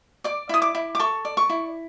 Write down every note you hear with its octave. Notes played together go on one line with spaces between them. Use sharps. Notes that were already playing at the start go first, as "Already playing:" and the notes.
D5 D6
E4 D#6
D6
E4
D6
A4 C#6
D5
C#6
E4